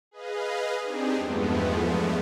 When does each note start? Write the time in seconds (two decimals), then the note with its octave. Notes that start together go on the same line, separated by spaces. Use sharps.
0.11 G#4 B4 D#5 F5
0.80 C4 D4 D#4 G4 G#4
1.16 E2 G2 F3 G#3 A3 B3